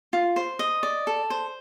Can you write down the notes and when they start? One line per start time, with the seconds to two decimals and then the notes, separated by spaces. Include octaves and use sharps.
0.13 F4
0.36 C5
0.59 D#5
0.83 D5
1.07 A4
1.30 C5